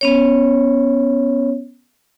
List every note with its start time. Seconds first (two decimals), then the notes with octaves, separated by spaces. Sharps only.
0.01 B3 C#4 C#5